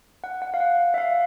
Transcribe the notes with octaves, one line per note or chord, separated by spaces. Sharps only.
F#5
F#5
F5
F#5
E5
F5